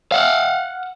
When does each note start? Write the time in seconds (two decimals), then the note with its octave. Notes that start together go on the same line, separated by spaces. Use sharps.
0.12 F5 F#5